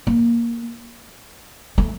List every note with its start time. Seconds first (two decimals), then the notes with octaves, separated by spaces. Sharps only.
0.07 A#3
1.78 A3